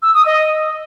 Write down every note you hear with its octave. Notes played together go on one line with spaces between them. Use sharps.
E6
D#6
D#5